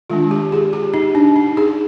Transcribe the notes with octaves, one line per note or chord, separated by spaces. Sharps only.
D#3 G#3 D4 F4
G4
G#4
G4
D#4
D4
D#4
G#4